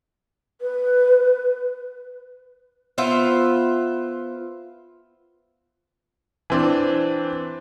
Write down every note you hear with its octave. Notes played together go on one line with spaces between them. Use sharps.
B4
B3 F4 C5 E5
E3 C4 D4